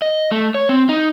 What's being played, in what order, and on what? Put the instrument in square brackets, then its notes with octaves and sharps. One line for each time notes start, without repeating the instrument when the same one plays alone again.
[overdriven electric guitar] D#5
A3
C#5
C4
D#4